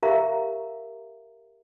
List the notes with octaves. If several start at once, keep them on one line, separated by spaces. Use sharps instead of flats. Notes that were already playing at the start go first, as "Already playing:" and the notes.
G4 A#4 E5 F5 A#5